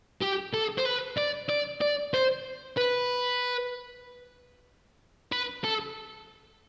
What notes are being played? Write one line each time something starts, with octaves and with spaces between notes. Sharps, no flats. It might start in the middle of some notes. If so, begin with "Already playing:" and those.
G4
A4
C5
B4
D5
D5
D5
C5
B4
B4
A4